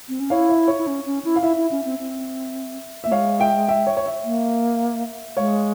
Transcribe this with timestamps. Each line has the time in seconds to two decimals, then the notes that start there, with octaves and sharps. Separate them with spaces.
0.09 C4
0.20 C#4
0.30 E4 C#5 F5
0.49 E5
0.68 C#5
0.78 E4
0.87 C#4
1.06 C#4
1.24 E4
1.36 F5
1.43 E4 E5
1.57 E4
1.71 C#4
1.85 C4
1.99 C4
3.04 A#3 E5
3.12 G#3 C#5 F5
3.40 E5 G5
3.68 E5 G5
3.87 C#5
3.97 C#5
4.06 E5
4.24 A#3
5.37 G#3 C#5 F5